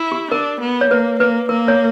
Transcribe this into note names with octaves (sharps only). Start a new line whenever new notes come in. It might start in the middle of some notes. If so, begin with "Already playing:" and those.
Already playing: E4
G4
D4 A#4
B3
C#5
A#3 B4
A#3 B4
A#3 A#4
C#5